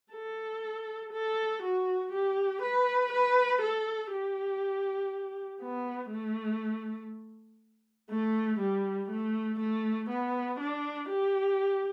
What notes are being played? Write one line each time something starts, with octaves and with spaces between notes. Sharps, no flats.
A4
A4
F#4
G4
B4
B4
A4
G4
B3
A3
A3
G3
A3
A3
B3
D4
G4